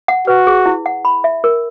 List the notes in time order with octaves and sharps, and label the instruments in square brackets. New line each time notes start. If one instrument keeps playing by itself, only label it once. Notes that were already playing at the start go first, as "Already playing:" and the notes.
[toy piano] F#5
[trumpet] F#4 [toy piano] B4
[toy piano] G#4
E4
F#5
B5
E5
A#4